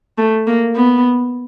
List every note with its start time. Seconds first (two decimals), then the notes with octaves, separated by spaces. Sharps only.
0.18 A3
0.47 A#3
0.76 B3